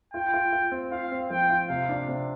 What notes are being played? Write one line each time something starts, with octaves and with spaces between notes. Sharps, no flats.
F4 G5
F4
F4
C4
F4 F5
C4
F3 G5
F4
C3 F5
D4
C3